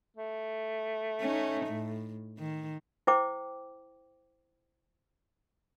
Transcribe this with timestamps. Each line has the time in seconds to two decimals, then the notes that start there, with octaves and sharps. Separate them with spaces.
0.16 A3
1.21 C#4 D#4
1.67 A2
2.39 D#3
3.07 E4 C5 G5 D6